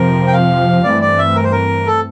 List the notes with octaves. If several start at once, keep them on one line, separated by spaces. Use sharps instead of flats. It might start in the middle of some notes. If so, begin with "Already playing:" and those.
Already playing: F2 C3 F3 C4 A#4
G5
F5
G2 E3 A3 C4 D5
D5
E5
A#4
C5
A#4
A4